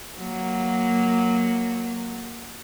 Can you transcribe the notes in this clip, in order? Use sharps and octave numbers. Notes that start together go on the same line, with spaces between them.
F#3 A#3